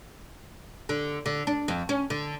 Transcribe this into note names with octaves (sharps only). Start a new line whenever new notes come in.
D3
D3
D4
F2
C#4
D3